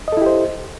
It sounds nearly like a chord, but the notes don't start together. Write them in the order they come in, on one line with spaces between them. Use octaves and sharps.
D#5 A4 E4 G4 C5